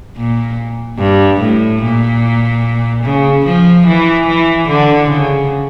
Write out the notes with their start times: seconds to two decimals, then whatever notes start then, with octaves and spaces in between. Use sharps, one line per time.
0.17 A#2
0.99 G2
1.41 A2
1.82 A#2
3.04 C#3
3.45 F3
3.87 E3
4.27 E3
4.68 D3
5.09 C#3